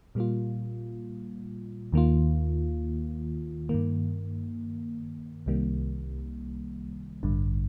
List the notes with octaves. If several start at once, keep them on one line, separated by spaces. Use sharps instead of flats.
A#2 G3 A#3 F4
D#2 D#3 A#3 F4
G2 D#3 A#3
C2 C3 D#3 G3 A#3
A1 G2 D3